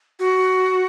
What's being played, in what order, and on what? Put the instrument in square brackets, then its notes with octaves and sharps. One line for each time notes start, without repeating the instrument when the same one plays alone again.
[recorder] F#4